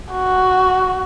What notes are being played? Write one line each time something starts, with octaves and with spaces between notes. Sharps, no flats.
F#4